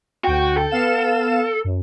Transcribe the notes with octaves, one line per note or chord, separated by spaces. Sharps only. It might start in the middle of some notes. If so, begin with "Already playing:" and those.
D2 F#4 G5
A4
B3 F5 E7
F#2